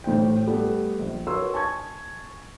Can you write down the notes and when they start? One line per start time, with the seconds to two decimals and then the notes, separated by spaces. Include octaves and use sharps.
0.04 A1 A2 C5 G5
0.47 G3 A3 B3
0.99 A#1
1.27 F#4 A#4 B4 C#5 C6 E6
1.54 G#5 A5 C#6 G#6